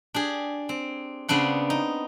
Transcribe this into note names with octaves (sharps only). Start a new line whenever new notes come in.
D4 G4 G#4
C4
C#3 B3 C4 D4 F#5
D#4